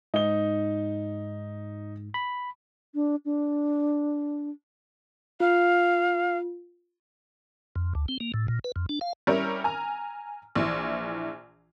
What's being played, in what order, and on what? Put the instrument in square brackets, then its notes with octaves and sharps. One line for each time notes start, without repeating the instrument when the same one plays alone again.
[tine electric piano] G#2 [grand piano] D#4 G7
[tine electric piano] B5
[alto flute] D4
D4
[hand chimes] F4 [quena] F5
[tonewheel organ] F2
D2
C4
A#3
A2
A#2
B4
F2
D4
F5
[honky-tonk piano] G3 C#4 E4 A#4
G#5 A#5 F6
A#1 E3